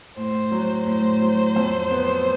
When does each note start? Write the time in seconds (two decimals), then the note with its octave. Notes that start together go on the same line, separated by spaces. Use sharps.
0.17 A2 C5
0.51 F#3
0.86 A2 C5
1.22 F#3
1.56 F2
1.91 B3